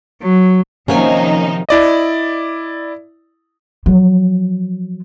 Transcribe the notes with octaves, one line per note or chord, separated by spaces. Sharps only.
F#3
C3 D#3 F3 F#3 A#3 C#4 D#4 G#5
E4 D5 D#5
F3 F#3